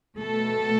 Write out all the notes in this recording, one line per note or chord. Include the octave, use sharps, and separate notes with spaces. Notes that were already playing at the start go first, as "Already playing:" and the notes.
B2 A3 B3 A4